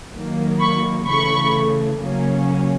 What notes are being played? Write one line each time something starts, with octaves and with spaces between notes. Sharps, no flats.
D#3 F#3 A#3
B5 C#6
C#3 E3 A3 B5 C#6
C#3 F#3 A#3 C#4